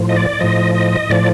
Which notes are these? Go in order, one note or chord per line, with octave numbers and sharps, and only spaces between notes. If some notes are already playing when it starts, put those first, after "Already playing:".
Already playing: A2 F3
D#5
D5
A2 F3 D#5
D#5
A2 F3 D5